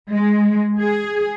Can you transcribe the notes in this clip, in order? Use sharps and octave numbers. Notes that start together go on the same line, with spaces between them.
G#3
G#4